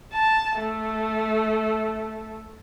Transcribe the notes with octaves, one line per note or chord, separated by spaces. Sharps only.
A5
A3